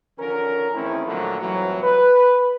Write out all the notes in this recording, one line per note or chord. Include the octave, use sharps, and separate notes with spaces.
D3 D#3 F3 C#4 A#4
E2 D#3 A3 C4 C#4 E4
A#2 D3 D#3 F3 F#3 A3
C2 F2 A2 E3 F#3
B4